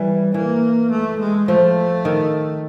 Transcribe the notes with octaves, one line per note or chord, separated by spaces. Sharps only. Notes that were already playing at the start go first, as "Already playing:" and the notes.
Already playing: E3 G3
E3 A#3
A3
G#3
F3 A3
D#3